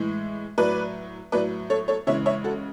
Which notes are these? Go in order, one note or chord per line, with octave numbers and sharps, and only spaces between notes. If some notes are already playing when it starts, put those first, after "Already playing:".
Already playing: A2 E3 G#3
A2 F#3 B4 D5
A2 F#3 B4 D5
A4 C#5
A4 C#5
C#3 E3 G#3 C#5 E5
C#5 E5
F#4 A4